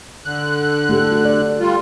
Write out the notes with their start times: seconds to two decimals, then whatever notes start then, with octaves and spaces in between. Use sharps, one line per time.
0.25 D3 F#6
0.89 A3 G4 A4
1.12 F#4
1.25 D5
1.60 G3 F4